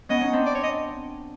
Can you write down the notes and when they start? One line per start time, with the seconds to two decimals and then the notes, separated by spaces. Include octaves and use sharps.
0.09 B3 C#4 D#5
0.21 C#4 D#4
0.33 C4 D4
0.46 D5
0.55 C#5
0.63 D#5